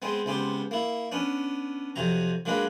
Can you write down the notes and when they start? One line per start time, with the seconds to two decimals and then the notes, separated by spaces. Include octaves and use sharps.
0.02 G#3 B3 C4
0.26 C#2 B3 C4 G4
0.71 A#3 E4
1.12 B3 C#4 D4
1.96 F2 C3 F#3 A#5
2.45 F#3 G#3 A#3 D4 B4